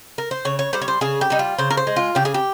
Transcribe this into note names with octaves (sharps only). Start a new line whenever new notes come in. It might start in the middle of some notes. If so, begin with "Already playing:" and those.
A#4
C5
C#3 C#5
C#5
G3 C5
C#5
C5
C#3 G#4
G4
G3 D#4
F4
C#3 C5
A#4
C5
G#3
F4
C#3 G4
G#4
G4